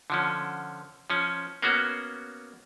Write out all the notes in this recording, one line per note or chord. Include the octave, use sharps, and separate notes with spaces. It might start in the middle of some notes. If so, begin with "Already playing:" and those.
D3 F3 C#4
F3 C#4
A#3 B3 C#4 F#4